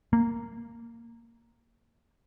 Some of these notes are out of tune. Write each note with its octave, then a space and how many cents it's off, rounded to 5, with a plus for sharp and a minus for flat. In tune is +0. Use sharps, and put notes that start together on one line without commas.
A#3 -10